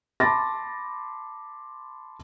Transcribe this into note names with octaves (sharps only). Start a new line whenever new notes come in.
A5 B5 C6 D6 A6 A#6